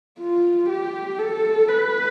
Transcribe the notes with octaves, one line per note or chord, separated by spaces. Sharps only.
F4
G4
A4
B4